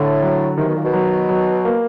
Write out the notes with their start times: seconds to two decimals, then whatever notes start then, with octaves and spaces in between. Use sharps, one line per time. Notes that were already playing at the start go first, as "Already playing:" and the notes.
Already playing: A2 D3
0.23 F#3
0.58 C3 D#3
0.67 B2
0.75 A#2
0.84 B2
0.93 F#3
1.29 F#3
1.65 A#3